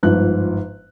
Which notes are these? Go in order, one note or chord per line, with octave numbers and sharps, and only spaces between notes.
G1 G#2 F3 F#6